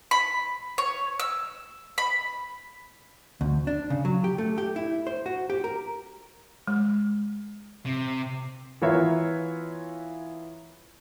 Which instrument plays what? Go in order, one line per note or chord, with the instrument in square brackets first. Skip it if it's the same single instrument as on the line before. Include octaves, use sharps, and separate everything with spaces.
[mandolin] B5
C#5
E6
B5
[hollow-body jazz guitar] D2
D4
C#3
F#3
G4
A3
G4
E4
C5
F#4
G4
A#4
[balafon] G#3
[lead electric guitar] C3
[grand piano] E3 B3 F4 A#4 C#5 E5